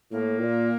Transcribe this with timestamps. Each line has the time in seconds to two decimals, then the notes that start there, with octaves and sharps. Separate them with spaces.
0.11 A2 A#3
0.39 A#2